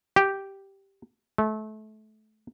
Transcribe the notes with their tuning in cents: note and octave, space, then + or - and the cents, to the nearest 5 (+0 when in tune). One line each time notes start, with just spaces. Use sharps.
G4 -5
A3 -30